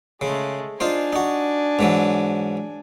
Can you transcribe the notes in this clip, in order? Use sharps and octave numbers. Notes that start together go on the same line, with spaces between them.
C#3 G#3 A3
D4 D#4 F4 C5 G#5
D#4 F#4
G#2 E3 F#3